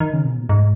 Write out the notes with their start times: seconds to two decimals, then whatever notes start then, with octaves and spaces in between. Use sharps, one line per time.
0.00 D#3
0.13 C#3
0.25 B2
0.38 A#2
0.49 G#2